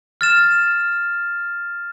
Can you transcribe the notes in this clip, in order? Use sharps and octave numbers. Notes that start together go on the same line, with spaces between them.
F6 A6 E7